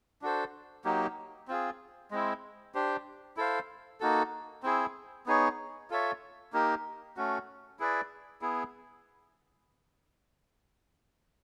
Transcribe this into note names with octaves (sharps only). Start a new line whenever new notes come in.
D4 F#4 A4 C5
F#3 A#3 D#4 G4
C4 F4 G#4
G#3 C4 E4
D4 G4 C5
E4 A4 C5 F5
A#3 D#4 F#4 A4
C4 E4 G#4
B3 D#4 G#4 C#5
F4 A4 C#5 E5
A#3 D#4 G4 A#4
A3 C#4 F#4
E4 G#4 B4 D5
B3 E4 G#4